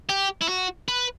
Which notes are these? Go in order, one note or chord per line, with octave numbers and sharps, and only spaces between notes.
G4
E4
F#4
B4